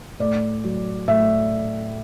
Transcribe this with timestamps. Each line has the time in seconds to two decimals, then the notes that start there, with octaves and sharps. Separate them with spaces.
0.20 A2 D5
0.64 F#3
1.08 A2 E5